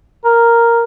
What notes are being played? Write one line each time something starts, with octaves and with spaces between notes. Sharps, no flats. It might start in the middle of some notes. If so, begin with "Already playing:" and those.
A#4